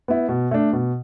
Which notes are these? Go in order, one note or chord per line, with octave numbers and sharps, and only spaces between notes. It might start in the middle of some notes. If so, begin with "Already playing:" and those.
B3 E4
B2
A3 D4
B2